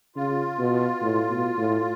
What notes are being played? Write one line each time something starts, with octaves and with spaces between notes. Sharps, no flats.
C#3 F4
B2
A2
B2
A2